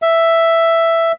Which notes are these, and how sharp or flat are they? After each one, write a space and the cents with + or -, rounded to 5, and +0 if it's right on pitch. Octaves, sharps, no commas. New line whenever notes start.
E5 +5